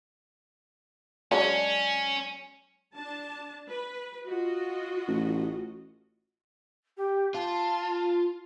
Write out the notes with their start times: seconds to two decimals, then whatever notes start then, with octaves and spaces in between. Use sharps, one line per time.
1.32 F#3 G#3 C#4 D4
2.94 D4 A5
3.68 B4
4.26 F4 F#4 D#5
5.07 A1
6.97 G4
7.35 F4 A5